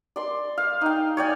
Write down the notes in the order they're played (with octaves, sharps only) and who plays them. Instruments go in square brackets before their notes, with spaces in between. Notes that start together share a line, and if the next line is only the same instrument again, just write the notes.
[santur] D5 C6
F5
D#4 G5
C#5 D5 G5 G#5